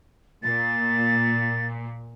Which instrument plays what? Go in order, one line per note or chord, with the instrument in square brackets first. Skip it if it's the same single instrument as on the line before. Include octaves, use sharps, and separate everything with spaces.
[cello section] A#2 [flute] A6